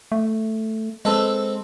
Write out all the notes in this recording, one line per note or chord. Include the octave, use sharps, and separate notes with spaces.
A3
G#3 C4 A4 B4